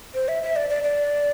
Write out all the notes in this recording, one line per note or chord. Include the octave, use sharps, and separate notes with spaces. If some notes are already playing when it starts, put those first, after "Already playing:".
C5
E5
E5
D5
D5
D5